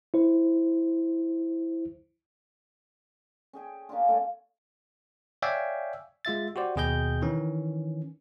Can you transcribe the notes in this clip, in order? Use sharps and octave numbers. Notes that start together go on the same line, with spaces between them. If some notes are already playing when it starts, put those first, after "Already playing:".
E4 C5
C#4 G#4 G5
A#3 C#4 D4 F4
G2 A3 C#5
C#5 D5 E5 F5 G5 G#5
G#3 F4 E5 A6
F#4 G4 C5 D5
D#2 B2 G#4 D#5 G5 G6
D#3 E3 C#4